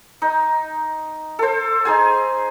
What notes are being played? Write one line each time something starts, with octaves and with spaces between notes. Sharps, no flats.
D#4
A4 C5
D#4 G#4 G#5